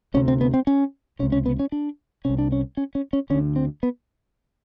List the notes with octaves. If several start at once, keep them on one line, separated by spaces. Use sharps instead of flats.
D2 C3 C#4
C4
B3
C4
C#4
C#2 C3 C#4
C#4
B3
C#4
D4
C2 C3 C#4
D4
C#4
C#4
C#4
C#4
D2 D3 C#4
C4
B3